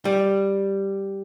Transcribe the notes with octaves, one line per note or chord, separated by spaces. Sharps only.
G3